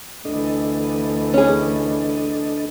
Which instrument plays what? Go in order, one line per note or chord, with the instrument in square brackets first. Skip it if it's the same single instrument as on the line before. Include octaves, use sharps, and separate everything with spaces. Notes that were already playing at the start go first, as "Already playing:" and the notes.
[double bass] D2 E3 [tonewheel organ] D4 A4 D#5
[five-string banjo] C#4 G#4